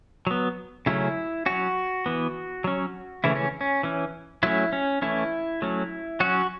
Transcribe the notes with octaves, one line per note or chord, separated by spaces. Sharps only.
F#3 B3
C#3 F#3 A3 C#4 E4
F#3 C#4 F#4
E3 B3
F#3 C#4
C#3 E3 A3 C#4 E4
C#4
C#4
E3 C#4
F#3 A3 C#4 E4
C#4
E3 A3 C#4 E4
F#3 A3 C#4
F#3 C#4 F#4